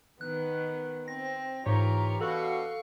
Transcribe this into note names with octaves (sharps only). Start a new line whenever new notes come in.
D#3 B3 F#6
C4 A#6
G#2 E3 F4 G4 A#4 C#5
B2 D4 F#4 A4 F5 C#6